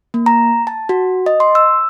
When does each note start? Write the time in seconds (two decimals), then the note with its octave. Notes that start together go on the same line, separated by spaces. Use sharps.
0.14 A#3
0.26 A#5
0.67 A5
0.89 F#4
1.26 D#5
1.40 C6
1.55 E6